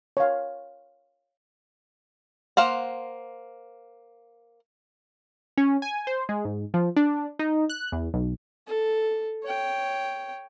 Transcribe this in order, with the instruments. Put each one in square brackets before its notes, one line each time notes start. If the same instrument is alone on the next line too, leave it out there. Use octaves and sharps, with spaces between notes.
[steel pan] C#5 F5
[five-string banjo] A#3 C5 F5 F#5
[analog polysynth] C#4
G#5
C5
G#3
G#2
F3
D4
D#4
F#6
E2
B1
[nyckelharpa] A4
C#5 G5